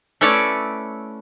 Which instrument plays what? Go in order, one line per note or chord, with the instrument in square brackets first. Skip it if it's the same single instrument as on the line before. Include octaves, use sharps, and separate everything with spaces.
[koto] A3 C#4 E4 B4 C#5 D5